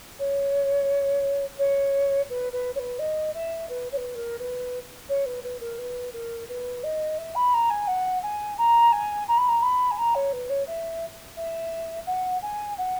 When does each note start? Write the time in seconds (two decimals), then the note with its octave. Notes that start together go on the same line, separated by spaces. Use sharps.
0.19 C#5
1.59 C#5
2.30 B4
2.53 B4
2.75 C#5
2.79 B4
2.99 D#5
3.35 E5
3.69 B4
3.92 C#5
3.97 B4
4.15 A#4
4.39 B4
5.09 C#5
5.26 B4
5.44 B4
5.61 A#4
5.78 B4
6.14 A#4
6.49 B4
6.83 D#5
7.18 E5
7.35 B5
7.54 A#5
7.70 G#5
7.87 F#5
8.23 G#5
8.58 A#5
8.92 G#5
9.28 A#5
9.37 B5
9.48 A#5
9.62 B5
9.91 G#5
9.98 A#5
10.15 C#5
10.33 B4
10.49 C#5
10.67 E5
11.37 E5
12.07 F#5
12.42 G#5
12.78 F#5